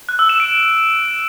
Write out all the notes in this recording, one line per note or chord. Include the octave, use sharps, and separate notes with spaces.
F#6
E6
E7
D7